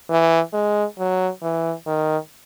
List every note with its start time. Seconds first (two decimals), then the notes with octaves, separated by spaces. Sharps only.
0.09 E3
0.53 G#3
0.99 F#3
1.43 E3
1.86 D#3